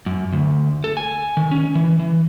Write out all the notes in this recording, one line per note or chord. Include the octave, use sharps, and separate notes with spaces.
F#2
D2
A4
G#5
D#3
C#4
E3
E3